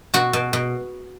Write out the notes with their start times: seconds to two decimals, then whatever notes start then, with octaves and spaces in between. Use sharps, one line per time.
0.14 B2 F#4
0.33 B2
0.53 B2